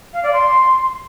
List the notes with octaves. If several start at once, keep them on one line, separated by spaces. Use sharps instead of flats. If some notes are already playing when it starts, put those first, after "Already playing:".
F5
D5
C6